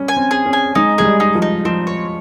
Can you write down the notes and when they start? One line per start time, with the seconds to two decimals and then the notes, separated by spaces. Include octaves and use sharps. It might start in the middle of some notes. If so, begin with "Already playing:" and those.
Already playing: G3 C#4
0.08 G#5
0.17 C4
0.31 G#4
0.46 C#4
0.53 G#5
0.75 G#3 D#4
0.98 G#3 G#4
1.05 G3
1.20 D#4
1.35 F3
1.42 D#4
1.65 F3 C4
1.87 C#5